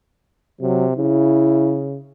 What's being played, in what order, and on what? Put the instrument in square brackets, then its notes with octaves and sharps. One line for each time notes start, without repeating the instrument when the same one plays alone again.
[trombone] C3 [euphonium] F#3
[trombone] C#3 [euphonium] E4